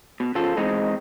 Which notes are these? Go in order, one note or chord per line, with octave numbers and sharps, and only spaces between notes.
B2
C#3 F3 F4 A4
E3 G#3 C4 D#4